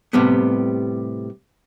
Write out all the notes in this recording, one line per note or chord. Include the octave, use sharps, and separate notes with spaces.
A2 C3 G3 B3